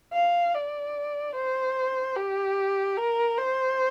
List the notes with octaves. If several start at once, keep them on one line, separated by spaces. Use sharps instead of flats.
F5
D5
C5
G4
A#4
C5